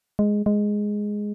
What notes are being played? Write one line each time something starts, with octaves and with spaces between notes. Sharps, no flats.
G#3
G#3